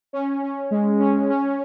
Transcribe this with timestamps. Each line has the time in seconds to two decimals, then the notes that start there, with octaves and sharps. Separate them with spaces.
0.13 C#4
0.43 C#4
0.71 G#3
1.00 C#4
1.30 C#4